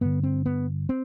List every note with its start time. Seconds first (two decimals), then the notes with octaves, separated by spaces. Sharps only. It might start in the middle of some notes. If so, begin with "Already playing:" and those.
0.01 G2 D3 B3
0.23 C4
0.46 B3
0.89 C4